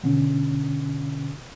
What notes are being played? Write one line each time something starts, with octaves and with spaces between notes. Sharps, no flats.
B2 D3 C#4